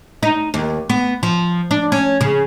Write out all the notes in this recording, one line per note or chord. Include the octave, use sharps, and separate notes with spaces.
D#4
D#2
B3
F3
D4
C#4
C#3